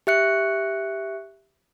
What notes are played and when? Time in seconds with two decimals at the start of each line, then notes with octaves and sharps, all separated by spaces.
0.07 G4 E5 F#6 C#7